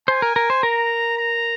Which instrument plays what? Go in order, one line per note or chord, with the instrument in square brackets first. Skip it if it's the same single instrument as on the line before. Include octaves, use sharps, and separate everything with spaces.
[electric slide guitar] C5 [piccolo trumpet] G#5
[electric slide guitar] A#4
A#4
C5
[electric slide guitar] A#4 [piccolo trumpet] A#5
[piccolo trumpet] A#5